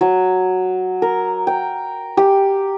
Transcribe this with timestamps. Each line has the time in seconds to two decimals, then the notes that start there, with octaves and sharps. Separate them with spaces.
0.01 F#3
1.02 A#4
1.47 G5
2.17 G4